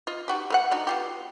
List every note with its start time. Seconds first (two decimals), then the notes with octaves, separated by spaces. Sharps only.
0.07 F4 D#5
0.28 D#4 F#4 G4
0.50 A3 A#4 F#5
0.71 D4 D#4 F#4
0.87 B3 F4 G4